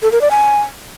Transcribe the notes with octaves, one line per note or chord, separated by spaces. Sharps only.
A4
A#4
D5
G#5